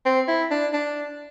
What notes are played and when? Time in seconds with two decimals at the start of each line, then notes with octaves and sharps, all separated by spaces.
0.06 C4
0.28 E4
0.51 D4
0.73 D4